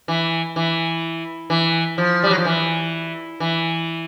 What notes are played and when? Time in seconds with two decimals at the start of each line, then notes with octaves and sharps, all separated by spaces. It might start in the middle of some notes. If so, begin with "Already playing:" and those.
0.08 E3
0.56 E3
1.50 E3
1.98 F3
2.23 G3
2.31 F#3
2.38 F3
2.45 E3
3.40 E3